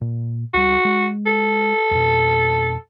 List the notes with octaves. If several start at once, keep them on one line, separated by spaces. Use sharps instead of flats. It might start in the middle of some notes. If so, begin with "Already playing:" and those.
A#2
C#2 G3 F#4
G#3
A4
F2 B2